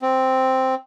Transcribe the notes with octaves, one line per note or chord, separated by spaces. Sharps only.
C4